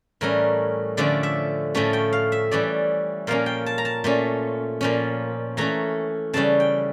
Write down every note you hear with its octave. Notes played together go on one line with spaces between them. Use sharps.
A2 E3 G3 C#4 A#4
D3 F3 A3 C#4 D5
E5
A2 F3 A3 C#4
G5
F5
E5
E3 G3 C#4 D5
A#2 F3 A#3 C#4 F5
G5
A5
A#5
A5
A#2 A3 C#4
A#2 F3 C#4
E3 A3 C#4 A#5
C#3 E3 G3 C#4 A5
G5